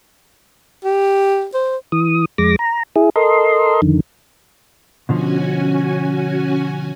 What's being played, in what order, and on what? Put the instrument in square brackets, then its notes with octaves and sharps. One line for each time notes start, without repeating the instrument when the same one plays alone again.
[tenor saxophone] G4
C5
[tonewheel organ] E3 D#6
F2 G#3 D6 A#6
A#5
E4 G#4
A4 A#4 D#5 C6
F2 D3 D#3
[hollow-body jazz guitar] B2 D3 F3 [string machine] C#4 F#4 G#5